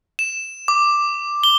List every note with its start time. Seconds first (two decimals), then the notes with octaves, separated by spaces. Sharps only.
0.19 E7
0.68 D6
1.44 G7